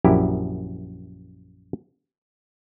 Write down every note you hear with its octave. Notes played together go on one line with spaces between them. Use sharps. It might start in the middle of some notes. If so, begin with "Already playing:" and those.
A#1 F#2 E4 G4